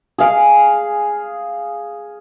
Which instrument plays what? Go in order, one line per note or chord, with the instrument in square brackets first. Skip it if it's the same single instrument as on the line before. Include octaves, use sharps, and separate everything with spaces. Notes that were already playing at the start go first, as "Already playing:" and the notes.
[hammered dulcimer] G#4 F5